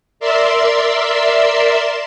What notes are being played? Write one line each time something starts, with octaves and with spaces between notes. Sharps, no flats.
A#4 D5 E5 C6 E6